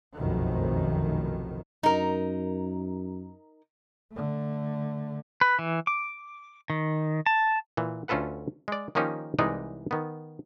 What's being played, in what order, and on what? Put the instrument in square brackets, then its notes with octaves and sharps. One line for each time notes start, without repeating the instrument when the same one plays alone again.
[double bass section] F1 B1 F#2 A2 D#3
[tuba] F#2 [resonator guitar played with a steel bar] D#4 A#4
[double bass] D3 A3
[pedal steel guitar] B4
E3
D6
D#3
A5
[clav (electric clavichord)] A#2 E3
D2 C#4 F4 A4 B4 F#5
G#3 D5
D#3 F3 A#3 C#4 D#4 G4
C2 E3 G#3 D#4 D5 D#5
D#3 B3